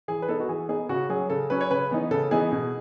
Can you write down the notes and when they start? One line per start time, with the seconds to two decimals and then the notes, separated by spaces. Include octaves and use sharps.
0.08 E3 G#4
0.22 B4
0.29 B3 D#4 A4
0.40 F#4
0.49 E3 G#4
0.69 B3 D#4 G#4
0.89 C#3 F#4
1.09 F#3 C#4 G#4
1.30 C#3 A4
1.50 F#3 C#4 B4
1.61 C#5
1.71 C#3 B4
1.91 E3 B3 D#4
2.11 C#3 A4
2.31 E3 B3 D#4 G#4
2.52 B2